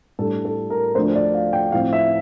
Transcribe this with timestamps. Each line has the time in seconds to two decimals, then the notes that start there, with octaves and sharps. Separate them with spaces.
0.19 A2 G3 D4 A4
0.45 A4
0.70 A#4
0.95 D2 D3 F3 A3 D4 C5
1.16 D5
1.34 F5
1.53 G5
1.72 A2 F3 C4 F5
1.93 E5